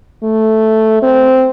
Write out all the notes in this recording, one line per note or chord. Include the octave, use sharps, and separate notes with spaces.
A3
C4